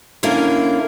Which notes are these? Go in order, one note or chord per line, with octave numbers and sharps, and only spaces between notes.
D3 A#3 C#4 E4 A#4